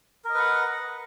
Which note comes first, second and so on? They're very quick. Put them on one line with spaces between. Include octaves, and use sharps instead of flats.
A#4 D#5 B4 F#5